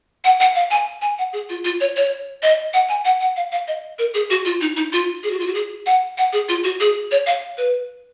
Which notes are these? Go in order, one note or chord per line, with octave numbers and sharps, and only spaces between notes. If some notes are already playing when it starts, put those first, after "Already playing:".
F#5
F#5
F5
G#5
G#5
F#5
G#4
F4
F4
C#5
C#5
D#5
F#5
G#5
F#5
F#5
F5
F5
D#5
A#4
G#4
F#4
F4
D#4
D#4
F4
G#4
F#4
F4
F#4
G#4
F#5
F#5
G#4
F4
F#4
G#4
C#5
F5
B4